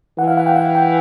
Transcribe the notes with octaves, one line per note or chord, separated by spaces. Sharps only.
E3 F#5
F5
F#5
G5
F#5
G5